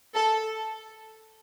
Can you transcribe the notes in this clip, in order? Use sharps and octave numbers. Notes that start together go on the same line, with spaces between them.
A4